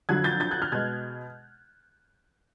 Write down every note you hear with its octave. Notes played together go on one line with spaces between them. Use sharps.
F2 D3 F#3 F#6 G#6
G6 A6
G6 A6
F#6 G#6
F6 G6
B2 G#3 F#6 G#6